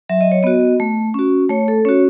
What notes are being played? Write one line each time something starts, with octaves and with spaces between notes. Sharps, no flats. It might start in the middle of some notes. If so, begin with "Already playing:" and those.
F#3 E5
D#5
C#5
B3 F#4 D#5
A3
C#4 F#4
A3 C#5
A4
C#4 F#4 C#5